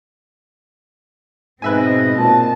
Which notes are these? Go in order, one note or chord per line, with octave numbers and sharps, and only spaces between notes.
G#2 B2 C4 B4 D#5 E5 G#5
A#2 A5